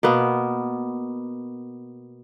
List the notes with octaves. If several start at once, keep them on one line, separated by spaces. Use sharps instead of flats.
B2 A#3 B3